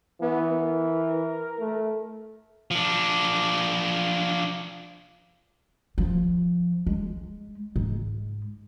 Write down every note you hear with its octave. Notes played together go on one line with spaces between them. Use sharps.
E3 B3
A#4
A3
F3 D4
F3
G#3
G#2